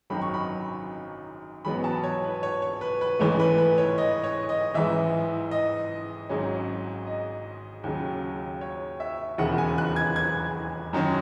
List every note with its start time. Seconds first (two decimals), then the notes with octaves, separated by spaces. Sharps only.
0.10 G#1 F#2 D#3 F#3 B5
0.22 C#6
0.34 B5
1.65 A1 G#2 F#3 B3 B5
1.84 A5
2.04 C#5
2.23 B4
2.43 C#5
2.62 C#5
2.81 B4
3.01 B4
3.19 A1 G#2 E3 A3 C#5
3.39 B4
3.58 B4
3.78 C#5
3.98 D#5
4.24 C#5
4.49 D#5
4.74 A1 G#2 E3 E5
5.51 D#5
6.29 G#1 G#2 F#3 C#4
7.07 D#5
7.84 D#2 C#3 F#3 C#4
8.61 C#5
9.00 E5
9.38 E1 D#2 C#3 F#5
9.58 G#5
9.78 F#6
9.96 G#6
10.16 G#6
10.93 F#2 D#3 F#3 C#4